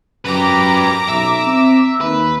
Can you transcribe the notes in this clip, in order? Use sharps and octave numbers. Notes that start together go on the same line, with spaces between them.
F#2 G4 B4 A#5 D6
B1 E5
C4
D#2 B4